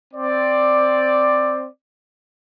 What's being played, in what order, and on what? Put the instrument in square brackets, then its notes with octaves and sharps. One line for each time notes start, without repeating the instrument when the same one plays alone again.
[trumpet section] C4 D5